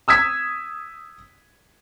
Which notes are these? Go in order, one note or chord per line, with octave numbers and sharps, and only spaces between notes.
D#6 E6 G#6 B6